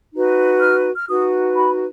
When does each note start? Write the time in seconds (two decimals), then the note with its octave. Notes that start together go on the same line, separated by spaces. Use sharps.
0.13 D#4 F#4 B4
0.61 F6
0.96 F6
1.08 D#4 F#4 B4 D#6
1.56 B5